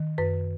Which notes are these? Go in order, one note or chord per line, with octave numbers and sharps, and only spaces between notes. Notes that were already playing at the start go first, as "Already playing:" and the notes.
Already playing: D#3
F#2 B4